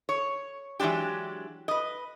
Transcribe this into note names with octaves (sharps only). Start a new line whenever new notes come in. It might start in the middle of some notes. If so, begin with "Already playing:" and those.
C#5
E3 F#3 G#3 D4 G4
B4 D#5